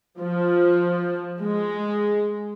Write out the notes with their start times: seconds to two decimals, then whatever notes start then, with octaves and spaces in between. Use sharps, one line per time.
0.19 F3
1.41 G#3